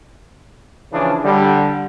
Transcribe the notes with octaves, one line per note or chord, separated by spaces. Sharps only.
C#3 E3 F3 D4 G#4
D3 G3